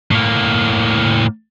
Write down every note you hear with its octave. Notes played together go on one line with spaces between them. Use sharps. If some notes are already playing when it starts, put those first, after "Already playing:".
A2 A#3